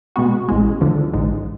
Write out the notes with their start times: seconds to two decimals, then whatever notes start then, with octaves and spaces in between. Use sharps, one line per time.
0.16 B2 G#3 B3 F#4
0.48 A1 A2 G#3
0.81 D2 D3 F3
1.13 A1 G#2 G#3